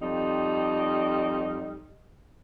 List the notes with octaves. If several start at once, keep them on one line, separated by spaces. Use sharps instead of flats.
F2 G3 D#4